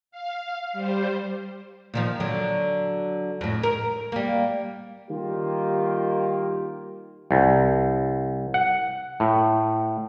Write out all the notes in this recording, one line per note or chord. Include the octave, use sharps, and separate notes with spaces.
F5
G3 C5
A#2 D#3 F3
D3 F#3
F2 A2
A#4
G3 A#3
D#3 G3 A#3 F4 G4
C2
F#5
A2